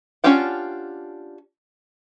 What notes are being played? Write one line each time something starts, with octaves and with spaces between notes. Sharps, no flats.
C#4 D4 F4 G4 F#5